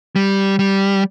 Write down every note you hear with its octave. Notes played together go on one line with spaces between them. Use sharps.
G3
G3